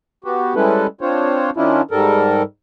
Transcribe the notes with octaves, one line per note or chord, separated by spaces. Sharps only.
B3 F#4 G4
G3 G#3 C#4 E4 A4 B4
C4 D4 F4 C5 C#5
D#3 C#4 D4 E4 F4
G#2 G3 A4 A#4